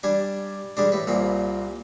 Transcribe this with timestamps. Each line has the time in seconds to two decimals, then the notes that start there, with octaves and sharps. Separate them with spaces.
0.03 G3 D4 G#5
0.77 G3 G#3 D4
0.92 A2 B4
1.07 C2 A#2 C4